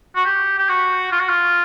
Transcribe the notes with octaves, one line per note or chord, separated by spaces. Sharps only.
F#4
G4
G4
F#4
F4
F#4
F4